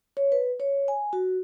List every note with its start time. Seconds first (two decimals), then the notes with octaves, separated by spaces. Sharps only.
0.17 C#5
0.32 B4
0.60 C#5
0.88 G#5
1.13 F#4